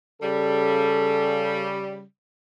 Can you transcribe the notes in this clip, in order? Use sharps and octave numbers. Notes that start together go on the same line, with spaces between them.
C#3 G3 A4